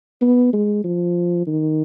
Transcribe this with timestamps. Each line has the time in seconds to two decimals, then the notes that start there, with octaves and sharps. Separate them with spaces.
0.22 B3
0.53 G#3
0.84 F3
1.47 D#3